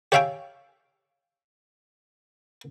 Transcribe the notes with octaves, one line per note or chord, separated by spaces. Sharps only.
G4 C#5 E5 F5 G5 G#5